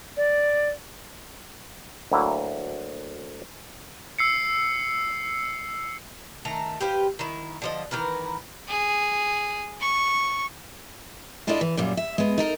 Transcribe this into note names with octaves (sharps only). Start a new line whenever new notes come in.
D5
D2 F#3 A#3 E4 G5
E6 C7 C#7
D#3 A3 A#5
G4 B4 C5 F5
D#3 E4
D3 F3 D#5
D#3 E3 A#4 B4
G#4
C#6
D4 E4 F4 A4 D5 D#5
E3
F#2 A#2 G3
E5
G#3 B3
D#4 A4 A#4